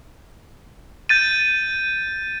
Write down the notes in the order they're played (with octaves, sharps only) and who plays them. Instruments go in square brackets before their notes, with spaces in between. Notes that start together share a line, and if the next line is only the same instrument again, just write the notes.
[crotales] G6 A6 D#7